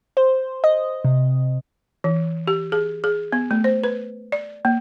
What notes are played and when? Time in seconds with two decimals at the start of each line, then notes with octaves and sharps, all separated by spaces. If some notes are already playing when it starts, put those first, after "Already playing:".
0.17 C5
0.64 D#5
1.04 C3
2.04 E3
2.47 G4
2.72 G#4
3.04 G#4
3.32 B3
3.51 A3
3.64 C5
3.84 B4
4.32 D5
4.65 A#3